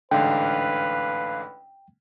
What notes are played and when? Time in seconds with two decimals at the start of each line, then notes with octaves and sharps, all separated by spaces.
0.11 A1 G#2 D3 B4 F5 G5